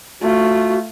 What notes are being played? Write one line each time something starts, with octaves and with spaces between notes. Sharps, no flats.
A3 F4 F#4